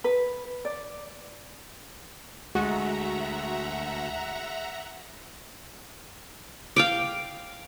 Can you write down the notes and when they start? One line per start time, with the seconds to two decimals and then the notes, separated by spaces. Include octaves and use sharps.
0.04 B4
0.65 D5
2.55 D2 G#3 F#4 E5 F#5 A#5
6.76 F5 G5 D6